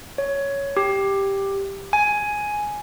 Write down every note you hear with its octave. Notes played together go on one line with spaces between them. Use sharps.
C#5
G4
G#5